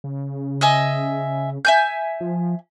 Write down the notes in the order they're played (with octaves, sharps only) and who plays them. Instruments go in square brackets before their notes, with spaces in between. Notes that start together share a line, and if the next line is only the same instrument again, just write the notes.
[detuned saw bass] C#3
[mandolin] D#5 E5 G#5
E5 G#5 G6
[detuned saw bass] F3